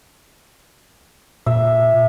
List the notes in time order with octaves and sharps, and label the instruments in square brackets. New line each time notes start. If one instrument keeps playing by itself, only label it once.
[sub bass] A#2 [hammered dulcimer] E5